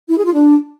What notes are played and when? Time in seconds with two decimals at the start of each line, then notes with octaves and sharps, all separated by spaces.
0.09 E4
0.17 G#4
0.25 F4
0.33 D4